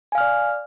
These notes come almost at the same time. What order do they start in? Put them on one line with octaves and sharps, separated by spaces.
G#5 F5 F6 D5